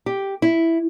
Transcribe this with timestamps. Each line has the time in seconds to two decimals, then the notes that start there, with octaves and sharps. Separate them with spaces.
0.06 G4
0.42 E4